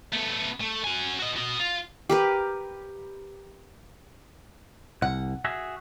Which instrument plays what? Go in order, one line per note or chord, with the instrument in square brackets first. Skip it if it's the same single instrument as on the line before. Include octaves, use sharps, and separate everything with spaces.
[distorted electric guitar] A3 B3
A3
F#4 G#5
F#4 D#5
F#4 D#5
F4
[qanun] G4 A#4 B4
[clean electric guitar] C2 [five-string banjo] F#5
[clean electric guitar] F#4 G#4 E5